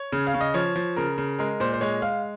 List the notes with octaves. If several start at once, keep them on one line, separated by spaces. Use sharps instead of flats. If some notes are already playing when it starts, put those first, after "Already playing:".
Already playing: C#5
C#3
F5
C#3
D#5
F3 C#5
F3
C#3 A#4
C#3
G#3 A#4
A#2 C5
C5
G#3 C#5
G#3 F5